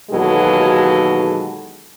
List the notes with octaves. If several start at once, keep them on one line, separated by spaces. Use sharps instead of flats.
D#2 B2 E3 F#3 G#3 A4